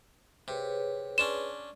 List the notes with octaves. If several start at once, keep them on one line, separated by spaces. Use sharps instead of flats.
C3 G#4 B4 C#5
C#4 D4 C6 E7